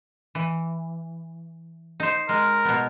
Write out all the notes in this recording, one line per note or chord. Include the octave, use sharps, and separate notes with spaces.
E3
D#4 C5
G#3 A#4
B2 B3